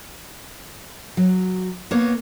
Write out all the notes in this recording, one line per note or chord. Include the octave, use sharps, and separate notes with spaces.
F#3
A#3 B3 C#5